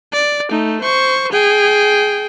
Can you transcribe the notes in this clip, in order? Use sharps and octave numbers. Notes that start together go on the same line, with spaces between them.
D5
A3 D#4
C5 C#6
G#4 G5